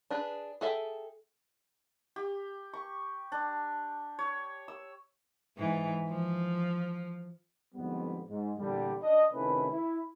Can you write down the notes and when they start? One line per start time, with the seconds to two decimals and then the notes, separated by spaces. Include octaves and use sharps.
0.10 D4 G#4 B4
0.61 G#4 A4 E5 G5
2.16 G4
2.73 C#6
3.32 D4
4.19 C#5
4.68 E6
5.57 G#2 E3
6.08 F3
7.75 F2 G#2 D3 G3 B3
8.29 G#2
8.59 E2 A#2 D3 G3
9.01 D4 D#5
9.32 C3 D#3 A3 C#4 E4 B4
9.71 E4